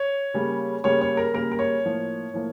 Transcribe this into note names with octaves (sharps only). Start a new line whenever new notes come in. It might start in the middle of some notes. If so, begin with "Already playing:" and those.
Already playing: C#5
C#3 G3 A#3
C#3 G3 A#3 C#5
C#5
A#4
C#3 G3 A#3 A#4
A#4
C#5
A2 F3 A#3
A2 F3 A#3